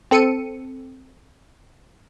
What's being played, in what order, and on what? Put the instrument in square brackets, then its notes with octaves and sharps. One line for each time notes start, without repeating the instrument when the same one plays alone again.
[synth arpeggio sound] C4 A4 C#7 D#7